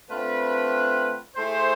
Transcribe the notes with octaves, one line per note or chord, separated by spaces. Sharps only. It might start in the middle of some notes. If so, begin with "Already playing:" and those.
D3 A3 C4 F4 B4
A3 E4 G#4 C5